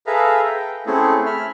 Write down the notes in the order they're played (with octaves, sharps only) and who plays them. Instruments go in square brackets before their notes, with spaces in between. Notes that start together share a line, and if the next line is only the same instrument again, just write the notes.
[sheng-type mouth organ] G#4 A4 B4 E5 F5 A#5
G5
A3 C4 C#4 E4 G#4 A4
E5 B5 F6